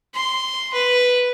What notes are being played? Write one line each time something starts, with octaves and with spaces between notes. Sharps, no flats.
C6
B4